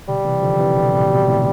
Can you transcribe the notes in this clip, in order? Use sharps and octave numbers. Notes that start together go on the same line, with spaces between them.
B2 D3 G3
C3 E3
D3 F3
C3 E3
B2 D3
A2 C3
B2
A2 C3